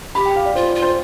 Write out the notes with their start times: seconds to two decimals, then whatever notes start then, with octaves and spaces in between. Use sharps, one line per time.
0.15 G4 B5
0.26 G5
0.36 F5
0.46 D5
0.55 F4 C5
0.69 D5
0.75 F4
0.82 C5